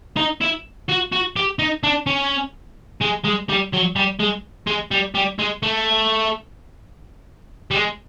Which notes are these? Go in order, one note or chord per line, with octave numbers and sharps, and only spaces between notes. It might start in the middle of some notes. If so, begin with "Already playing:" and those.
D#4
E4
F#4
F#4
G4
D#4
D4
C#4
G#3
G#3
G3
F#3
G3
G#3
G#3
G3
G3
G#3
A3
G3
G#3